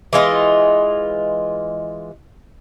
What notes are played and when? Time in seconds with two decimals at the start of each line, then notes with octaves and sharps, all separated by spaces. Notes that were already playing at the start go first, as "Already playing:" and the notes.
0.13 E3 G#3 F4 D#5